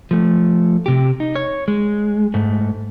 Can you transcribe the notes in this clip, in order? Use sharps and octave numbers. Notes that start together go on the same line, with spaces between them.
F3 A3
C3 G4
D#4
C#5
G#3
G#2 A3